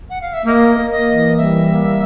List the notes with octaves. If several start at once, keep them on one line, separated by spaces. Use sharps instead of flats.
F#5
F5
E5
A#3 D#5 E5
A#3
D#5
E3
G3 E5
A#3